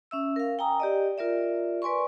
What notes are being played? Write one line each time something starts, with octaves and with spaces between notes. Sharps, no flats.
C#4 E5 E6
A#4 F5
G5 G#5 A#5 D#6
G4 D5 D#5
F4 A#4 D5 E5
B4 D5 G#5 C6 C#6